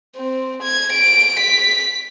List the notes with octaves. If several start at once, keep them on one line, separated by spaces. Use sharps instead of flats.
C4
G#6
D7
B6